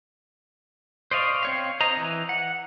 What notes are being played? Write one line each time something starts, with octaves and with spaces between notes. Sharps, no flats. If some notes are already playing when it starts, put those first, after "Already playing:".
C5 D5 D#5 F5 C#6
C4 C#5 F5
C5 D#5 A#5
E3
F#5